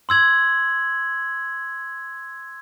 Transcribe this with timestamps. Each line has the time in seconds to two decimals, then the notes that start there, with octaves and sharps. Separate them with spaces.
0.09 C6 E6 G#6 F#7